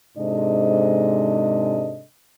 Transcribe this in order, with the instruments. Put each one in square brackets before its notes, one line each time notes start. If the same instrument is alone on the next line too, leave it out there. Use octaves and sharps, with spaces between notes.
[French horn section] G#2 C3 G#3 D4 A4 D#5